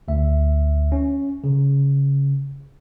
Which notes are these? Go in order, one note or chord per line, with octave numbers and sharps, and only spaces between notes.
D2 E5
C#4
C#3